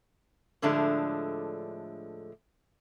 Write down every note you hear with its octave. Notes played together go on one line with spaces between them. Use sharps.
A2 D3 F3 G#3 A3 D4